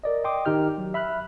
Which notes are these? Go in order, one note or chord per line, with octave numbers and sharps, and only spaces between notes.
A#4 D5 D#5
D#5 G5 C6 D6 D#6
D#3 D#4 G4 F6 G6
F#3
E5 B5 F6 F#6